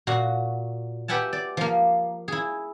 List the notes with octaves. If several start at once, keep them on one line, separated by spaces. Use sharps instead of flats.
A#2 F#4
G4 B4 E5 F#5 G#5 A5
D5
F3 A#3
E4 G#4